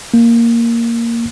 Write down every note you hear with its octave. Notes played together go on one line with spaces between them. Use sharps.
A#3